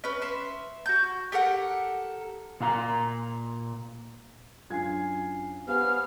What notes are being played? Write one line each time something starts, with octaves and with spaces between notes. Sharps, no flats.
C#4 B4
E5 C6
F#4 G6
G4 A4 A#4 F#5
A#2 F5 A#5
F#2 D4 F4 G#5 G#6 C7
B3 G4 C5 F5 G#5 F6